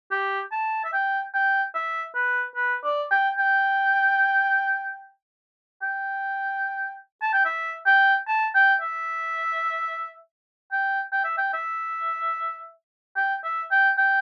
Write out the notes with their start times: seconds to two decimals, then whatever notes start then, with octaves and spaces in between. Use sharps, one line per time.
0.11 G4
0.52 A5
0.84 E5
0.93 G5
1.34 G5
1.74 E5
2.15 B4
2.56 B4
2.84 D5
3.11 G5
3.38 G5
5.82 G5
7.22 A5
7.33 G5
7.45 E5
7.86 G5
8.28 A5
8.55 G5
8.81 E5
10.72 G5
11.12 G5
11.24 E5
11.38 G5
11.53 E5
13.16 G5
13.44 E5
13.71 G5
13.97 G5